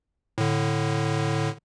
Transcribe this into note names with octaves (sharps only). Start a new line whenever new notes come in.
A2 D3